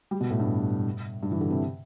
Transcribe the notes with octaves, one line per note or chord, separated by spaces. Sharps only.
G3
B2
A2
G2
G2
E3
D3
C3